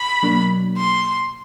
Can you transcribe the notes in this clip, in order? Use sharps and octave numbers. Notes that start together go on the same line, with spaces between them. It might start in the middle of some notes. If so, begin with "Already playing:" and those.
Already playing: B5
B2 F#3 A#3 D4
C6